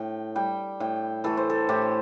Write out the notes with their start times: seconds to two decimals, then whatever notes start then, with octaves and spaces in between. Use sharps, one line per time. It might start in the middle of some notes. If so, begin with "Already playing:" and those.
Already playing: A2 G5
0.35 G3 G5
0.80 A2 G5
1.24 E3 A3 A4
1.37 C5
1.50 A4
1.69 A2 G4